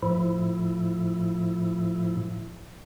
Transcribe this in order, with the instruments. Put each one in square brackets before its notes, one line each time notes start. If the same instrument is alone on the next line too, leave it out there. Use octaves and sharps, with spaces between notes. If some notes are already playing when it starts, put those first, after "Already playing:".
[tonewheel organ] A2 F3 E4